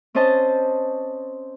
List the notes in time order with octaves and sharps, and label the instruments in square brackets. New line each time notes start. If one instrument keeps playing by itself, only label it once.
[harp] C4 C#4 C5 D#5 A5